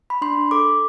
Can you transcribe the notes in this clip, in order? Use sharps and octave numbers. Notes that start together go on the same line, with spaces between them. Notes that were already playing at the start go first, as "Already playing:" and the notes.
B5
D4 C6
A4 D6